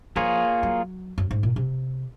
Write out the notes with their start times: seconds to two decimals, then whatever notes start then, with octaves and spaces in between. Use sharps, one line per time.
0.16 F3 A#3 F4 G#4 C#5
0.63 F#3
1.18 F#2
1.31 G#2
1.43 A#2
1.56 C3